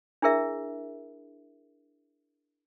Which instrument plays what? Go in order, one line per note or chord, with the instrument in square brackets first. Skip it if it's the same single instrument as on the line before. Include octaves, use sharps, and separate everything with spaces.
[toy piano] D4 E4 G#4 A#4 E5